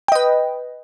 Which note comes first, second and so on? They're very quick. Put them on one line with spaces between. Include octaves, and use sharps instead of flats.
G5 D#5 B4